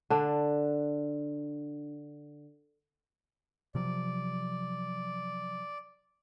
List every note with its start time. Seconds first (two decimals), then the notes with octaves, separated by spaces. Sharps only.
0.10 D3 D4
3.75 C3 F3 F#3 D5